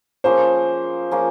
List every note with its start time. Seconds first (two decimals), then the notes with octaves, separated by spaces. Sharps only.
0.24 F3 A#3 C#4 G#4 C5
1.11 F3 A#3 C#4 G#4